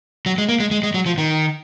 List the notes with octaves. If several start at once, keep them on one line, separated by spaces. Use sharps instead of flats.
F#3
G#3
A#3
G#3
G#3
G#3
F#3
F3
D#3